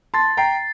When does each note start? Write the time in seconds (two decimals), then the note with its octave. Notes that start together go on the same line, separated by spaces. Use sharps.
0.14 A5 C6 A6
0.37 G5 A#5 C7